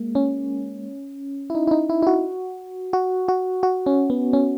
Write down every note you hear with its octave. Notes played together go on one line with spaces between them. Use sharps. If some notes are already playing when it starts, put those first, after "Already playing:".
Already playing: G#3 A#3
C#4
E4
D#4
E4
D#4
E4
E4
F#4
F#4
F#4
F#4
C#4
B3
C#4